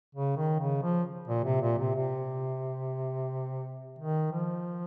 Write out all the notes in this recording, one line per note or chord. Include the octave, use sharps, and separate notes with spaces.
C#3
D#3
C#3
F3
A#2
C3
A#2
C3
C3
D#3
F3